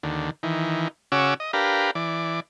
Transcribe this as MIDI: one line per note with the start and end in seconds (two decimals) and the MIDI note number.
0.03 0.30 39
0.03 0.30 50
0.43 0.88 51
0.43 0.88 52
1.12 1.34 49
1.12 1.34 61
1.12 1.34 66
1.12 1.34 86
1.12 1.34 88
1.40 1.51 75
1.53 1.91 62
1.53 1.91 67
1.53 1.91 70
1.53 1.91 71
1.53 1.91 77
1.95 2.40 52
1.95 2.40 74